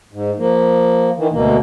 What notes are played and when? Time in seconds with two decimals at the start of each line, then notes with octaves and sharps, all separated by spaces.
0.12 G#2
0.38 F3 A#3
1.17 D#3 E3
1.32 D2 B2 A#3